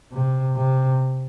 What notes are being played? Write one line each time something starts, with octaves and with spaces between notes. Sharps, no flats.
C3
C3